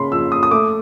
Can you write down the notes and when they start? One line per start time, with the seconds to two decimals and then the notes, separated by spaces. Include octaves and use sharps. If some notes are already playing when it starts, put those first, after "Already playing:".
Already playing: C#3 B5 C6
0.12 F2 E6
0.32 D#6
0.43 D#6
0.51 A3 D6